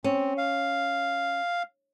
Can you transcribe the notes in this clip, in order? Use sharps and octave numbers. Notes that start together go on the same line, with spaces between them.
C4 C#4
F5